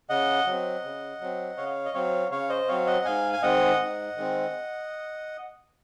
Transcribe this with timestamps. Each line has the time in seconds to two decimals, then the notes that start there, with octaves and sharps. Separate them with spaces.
0.09 C#3 D#5 F#5
0.46 F#3 C4
0.84 C#3
1.21 F#3 C4
1.57 C#3 C#5 F5
1.85 D#5
1.94 F#3 C4 C#5 F5
2.31 C#3 C#5 F5
2.49 C5 D#5
2.68 F#3 C4 C#5 F5
2.87 D#5 F#5
3.05 G#2 F5 G#5
3.33 G#5
3.43 D#3 G#3 C4 D#5 F#5
3.80 G#2
4.16 D#3 G#3 C4